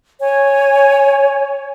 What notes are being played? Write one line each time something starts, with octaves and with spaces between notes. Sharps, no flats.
C#5 G#5